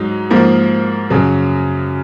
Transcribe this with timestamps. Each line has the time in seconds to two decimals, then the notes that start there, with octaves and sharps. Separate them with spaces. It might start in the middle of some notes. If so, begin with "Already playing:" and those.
Already playing: G#2 F#3 D#4
0.30 G#2 F3 A#3
1.10 F#2 C#3 F#3